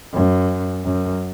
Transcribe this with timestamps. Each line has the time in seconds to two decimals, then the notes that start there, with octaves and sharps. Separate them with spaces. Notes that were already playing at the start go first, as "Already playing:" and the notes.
0.14 F#2
0.85 F#2